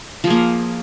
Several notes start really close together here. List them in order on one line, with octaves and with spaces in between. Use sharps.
F3 G#4 A#3